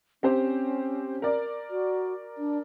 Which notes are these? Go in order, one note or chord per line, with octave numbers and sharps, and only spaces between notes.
C4 C#4 G4 C5
A#4 D5
F#4
D4